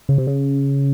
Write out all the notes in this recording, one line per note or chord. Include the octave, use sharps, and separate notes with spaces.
C#3
C3
C#3